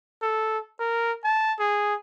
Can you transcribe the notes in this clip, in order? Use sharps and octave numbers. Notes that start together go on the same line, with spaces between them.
A4
A#4
A5
G#4